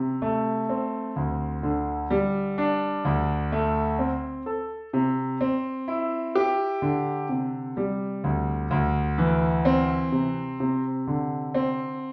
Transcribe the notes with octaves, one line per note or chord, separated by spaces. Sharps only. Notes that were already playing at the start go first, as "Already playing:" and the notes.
Already playing: C3
A3
C4
D2
D3
G3
D4
D2
A3
C4
A4
C3
C4
E4
G4
D3
C3
G3
D2
D2
E3
C4
C3
C3
D3
C4